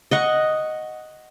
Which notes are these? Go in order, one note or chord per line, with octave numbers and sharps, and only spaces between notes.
D#5 F#5 C#6